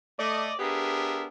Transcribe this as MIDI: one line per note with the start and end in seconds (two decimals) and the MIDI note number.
0.19 0.54 57
0.19 0.54 74
0.19 0.54 75
0.59 1.27 59
0.59 1.27 62
0.59 1.27 67
0.59 1.27 68
0.59 1.27 70
0.59 1.27 76